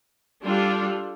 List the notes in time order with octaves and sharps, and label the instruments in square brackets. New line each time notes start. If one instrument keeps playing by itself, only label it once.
[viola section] G3 D4 F4 A4